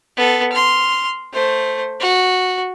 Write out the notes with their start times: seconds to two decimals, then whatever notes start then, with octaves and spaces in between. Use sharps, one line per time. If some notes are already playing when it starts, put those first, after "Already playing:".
0.17 B3 A4
0.52 C6 F6
1.34 A3 C5
2.00 F#4